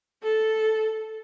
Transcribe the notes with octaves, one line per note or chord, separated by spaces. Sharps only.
A4